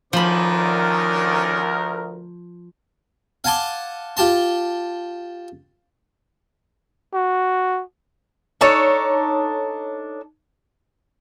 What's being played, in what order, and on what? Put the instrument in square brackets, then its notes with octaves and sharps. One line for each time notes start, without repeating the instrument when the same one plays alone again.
[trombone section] D2 A#4 [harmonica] D#3 C#4 D5 [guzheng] F3 B5
[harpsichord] F5 F#5 G#5 A5 C6 D6
F4 G4 A5 C6
[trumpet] F#4
[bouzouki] D4 D#4 A4 C#5